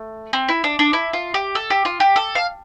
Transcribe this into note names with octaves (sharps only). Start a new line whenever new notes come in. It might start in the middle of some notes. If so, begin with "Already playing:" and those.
Already playing: A3
C4
E4
D4
D4
E4
F4
G4
A4
G4
F4
G4
A4
F5